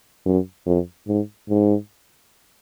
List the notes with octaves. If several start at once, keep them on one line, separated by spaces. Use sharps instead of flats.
F#2
F2
G#2
G#2